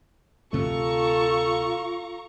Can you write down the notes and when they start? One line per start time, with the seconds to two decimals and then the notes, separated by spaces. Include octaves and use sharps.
0.53 D2 C3 A3 F4 A4 A#5 C#6